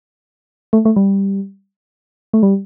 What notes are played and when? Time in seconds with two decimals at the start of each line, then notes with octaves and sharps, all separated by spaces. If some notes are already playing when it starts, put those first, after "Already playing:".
0.73 A3
0.85 A3
0.96 G3
2.34 A3
2.43 G3